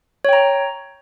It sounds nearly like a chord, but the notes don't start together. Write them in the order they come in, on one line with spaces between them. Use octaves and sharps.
C#5 G5 A#5